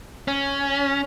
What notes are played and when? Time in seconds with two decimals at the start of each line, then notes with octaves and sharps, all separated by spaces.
0.28 C#4